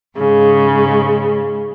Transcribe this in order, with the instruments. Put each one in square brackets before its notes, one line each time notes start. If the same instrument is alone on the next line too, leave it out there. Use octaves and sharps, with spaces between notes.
[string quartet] G#2 C#3